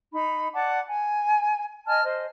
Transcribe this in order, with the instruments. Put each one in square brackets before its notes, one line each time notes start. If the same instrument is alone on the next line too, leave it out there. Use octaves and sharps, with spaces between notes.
[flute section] D#4 B5
D5 F#5 A5 D6
G#5
D#5 G#5 A5 F6
C5 D#5